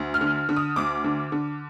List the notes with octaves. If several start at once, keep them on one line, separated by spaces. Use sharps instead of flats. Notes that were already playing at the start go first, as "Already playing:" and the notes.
Already playing: D2
F6
D3
D3
D#6
D2 D6
D3
D3